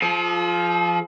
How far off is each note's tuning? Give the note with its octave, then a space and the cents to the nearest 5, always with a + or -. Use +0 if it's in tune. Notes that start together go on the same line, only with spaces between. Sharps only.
F3 +0 A4 -45